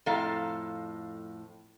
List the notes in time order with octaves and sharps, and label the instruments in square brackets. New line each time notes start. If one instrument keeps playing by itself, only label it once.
[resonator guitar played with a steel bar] F2 A2 A4 F5 A#5